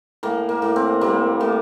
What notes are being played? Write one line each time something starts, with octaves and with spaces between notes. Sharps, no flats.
A2 A#3
A#3
A2
C4
G3 A#3
A2